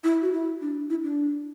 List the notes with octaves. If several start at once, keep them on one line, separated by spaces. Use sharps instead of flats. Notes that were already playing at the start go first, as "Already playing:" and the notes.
E4
F#4
E4
D4
E4
D4